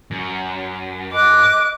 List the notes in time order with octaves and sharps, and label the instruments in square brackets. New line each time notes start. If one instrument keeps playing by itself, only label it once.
[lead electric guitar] F#2
[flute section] D#5 F#6 [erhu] D6